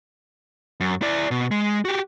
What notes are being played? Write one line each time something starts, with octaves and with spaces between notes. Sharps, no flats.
F#2
E4 D5
B2
G#3
F#4 G4